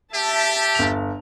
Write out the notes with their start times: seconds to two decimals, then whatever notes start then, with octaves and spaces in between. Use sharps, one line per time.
0.13 G4 E5 A5
0.75 G1 F7